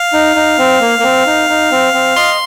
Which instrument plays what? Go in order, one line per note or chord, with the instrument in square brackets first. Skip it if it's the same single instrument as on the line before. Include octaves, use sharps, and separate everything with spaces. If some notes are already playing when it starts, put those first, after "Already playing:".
Already playing: [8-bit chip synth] F5
[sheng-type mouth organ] D#4
D#4
C4
A#3
A#3
C4
D#4
D#4
C4
C4
[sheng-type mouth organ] D#5 [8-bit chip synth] C6